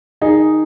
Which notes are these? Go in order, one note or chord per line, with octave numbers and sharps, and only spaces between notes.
D#3 D#4 G#4